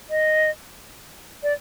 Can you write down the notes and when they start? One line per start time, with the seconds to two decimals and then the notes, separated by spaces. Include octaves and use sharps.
0.10 D#5
1.43 D5